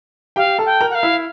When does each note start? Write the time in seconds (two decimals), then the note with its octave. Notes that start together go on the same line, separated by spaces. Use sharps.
0.36 G4 F5 G5
0.59 A4 A5
0.66 G5
0.81 A#4 A#5
0.90 F#5
0.95 F5
1.03 E4 E5